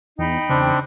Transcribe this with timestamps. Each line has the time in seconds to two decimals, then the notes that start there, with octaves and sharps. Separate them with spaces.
0.19 E2 D#4 G5 B5
0.49 E2 C#3 C4 D4